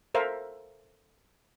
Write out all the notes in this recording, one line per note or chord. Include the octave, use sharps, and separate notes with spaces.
A4 A#4 C5 E5 F5